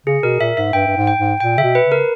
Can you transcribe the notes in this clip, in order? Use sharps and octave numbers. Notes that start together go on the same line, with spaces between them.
C#3 G#4
B2 A#4
A#2 E5
G#2 E5
G2 G5
G2
G#2
G5
G#2
A#2 G5
C#3 E5
B2
B4
C#3
A#4